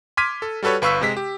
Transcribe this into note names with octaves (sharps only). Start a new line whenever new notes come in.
C6 D6 F6 G#6 B6 D#7
A4
G3 F#4 A4 B4 C#5
G1 B4 F5 C#6 E6 B6
C3 G#3 B6
G4